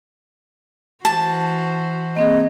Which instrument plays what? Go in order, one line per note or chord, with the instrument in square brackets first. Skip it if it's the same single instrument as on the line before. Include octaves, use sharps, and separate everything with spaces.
[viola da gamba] E3 F#4 C5 [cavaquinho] A5
[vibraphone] A#3 C4 G#4 [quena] D#5